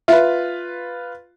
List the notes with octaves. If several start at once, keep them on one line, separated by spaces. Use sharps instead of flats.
F4 B4 E5